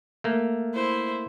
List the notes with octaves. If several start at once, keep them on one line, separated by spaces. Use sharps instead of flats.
A3 A#3
E4 C5